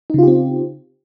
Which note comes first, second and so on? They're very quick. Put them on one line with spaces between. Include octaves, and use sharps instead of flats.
D#4 C#3 F4 G4 C4